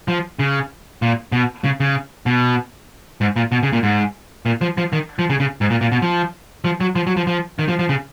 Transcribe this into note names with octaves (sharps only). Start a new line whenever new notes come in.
F3
C#3
A#2
B2
C#3
C#3
B2
G#2
A#2
B2
C#3
A#2
G#2
A#2
F3
F3
D#3
F3
C#3
C#3
G#2
A#2
A#2
B2
F3
F3
F#3
F3
F#3
F3
F3
D#3
F3
F3
C#3